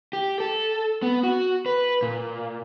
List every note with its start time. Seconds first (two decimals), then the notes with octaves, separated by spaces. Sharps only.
0.13 G4
0.40 A4
1.02 B3
1.23 F#4
1.66 B4
2.02 A#2